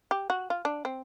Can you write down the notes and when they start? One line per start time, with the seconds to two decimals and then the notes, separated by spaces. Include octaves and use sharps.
0.11 G4
0.30 F#4
0.50 F4
0.65 D4
0.85 C4